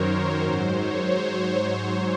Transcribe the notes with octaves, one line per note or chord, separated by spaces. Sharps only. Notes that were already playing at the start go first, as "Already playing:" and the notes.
Already playing: F#2 D#3 F#3 A#4 C5 C#5
G#2 F#3
C#5
C5